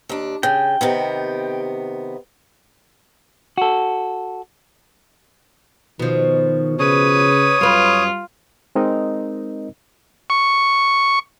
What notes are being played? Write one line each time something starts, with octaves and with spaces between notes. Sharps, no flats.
D#2 D4
C#3 G5
C3 D#3 B3
F#4 A4
B2 D#3 F3
C#3 B4 C#5 D#6
F#2 G3 F4 B4
G#3 C4 D#4 A#4 D#5
C#6